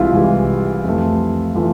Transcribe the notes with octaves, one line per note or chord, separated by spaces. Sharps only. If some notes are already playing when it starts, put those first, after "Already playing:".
Already playing: C2 C3 E3 G#3 E4 F4
C2 C3 E3 G#3
F2 C3 E3 A3
E3 A3 F4